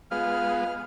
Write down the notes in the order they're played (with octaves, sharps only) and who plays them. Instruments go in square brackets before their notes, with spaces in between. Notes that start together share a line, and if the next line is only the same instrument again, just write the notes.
[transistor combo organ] G#3 B3 [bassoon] F4 [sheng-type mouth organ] F6